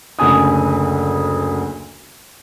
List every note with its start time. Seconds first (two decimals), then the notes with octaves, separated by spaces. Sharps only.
0.19 F#1 D2 C#3 G#5 D#6